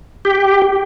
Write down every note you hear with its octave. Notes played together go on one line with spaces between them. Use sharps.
G4